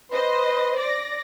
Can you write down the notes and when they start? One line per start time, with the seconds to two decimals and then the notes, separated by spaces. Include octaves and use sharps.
0.12 B4 C5 D#5 C6
0.78 D5 A#6